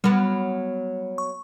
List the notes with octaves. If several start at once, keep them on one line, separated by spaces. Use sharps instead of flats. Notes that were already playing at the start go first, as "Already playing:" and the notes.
F#3 G3 B3
C#6